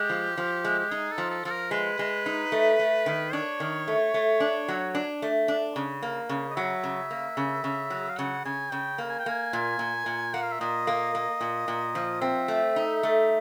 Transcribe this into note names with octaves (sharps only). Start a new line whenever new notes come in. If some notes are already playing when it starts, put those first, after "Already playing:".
Already playing: G#3 G4
F3
F3
G#3
G4
D#4 G#4
A4
F3
A4
F3 A4
A#4
G#3 B4
G#3
D#4
A3
A3
D#3
D4 C#5
D#3
A3
A3
D4
F#3
D4
A3
D4
C#3
A#3
C#3
D#5
F#3 E5
C#3
A#3
C#3
C#3
F#3
F5
C#3 F#5
C#3 G#5
C#3 G5
A#3
G#5
G5
A#3 G#5
A#2
A#2
A#2
A#3 F#5
F5
E5
A#2 D#5
A#3
A#3
A#2
A#2
F3
C4 E5
A3
D#4
A3